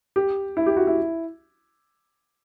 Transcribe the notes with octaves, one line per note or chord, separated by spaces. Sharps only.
G4
E4
G4
F#4
E4